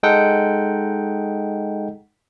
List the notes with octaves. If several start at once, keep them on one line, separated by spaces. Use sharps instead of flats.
G#3 D#4 A4 F#5 G5